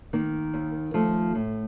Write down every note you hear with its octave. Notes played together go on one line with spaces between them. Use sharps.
D#3 A#3
D#2
F3 A3
A2